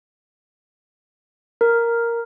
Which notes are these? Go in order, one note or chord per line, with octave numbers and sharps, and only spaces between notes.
A#4